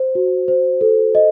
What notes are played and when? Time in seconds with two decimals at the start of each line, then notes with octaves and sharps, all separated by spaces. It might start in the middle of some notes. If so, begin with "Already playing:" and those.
Already playing: C5
0.15 F#4
0.48 C5
0.81 A4
1.15 D#5